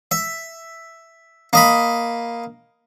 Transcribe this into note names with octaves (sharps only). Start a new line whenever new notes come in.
E5
A#3 D#5 B5